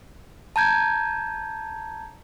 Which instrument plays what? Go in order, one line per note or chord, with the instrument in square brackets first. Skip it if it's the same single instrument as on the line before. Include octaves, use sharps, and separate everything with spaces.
[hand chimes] A5 A#5 G6 G#6